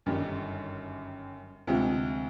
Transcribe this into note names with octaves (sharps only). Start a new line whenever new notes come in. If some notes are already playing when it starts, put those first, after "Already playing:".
G1 F#2 D#3 G3
D2 C3 F3 G#3 C4